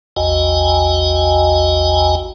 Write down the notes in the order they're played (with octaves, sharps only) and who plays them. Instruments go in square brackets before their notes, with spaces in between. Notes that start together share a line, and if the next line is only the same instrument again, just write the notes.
[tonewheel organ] A#1 E2 F#4 D#5 G5 G#5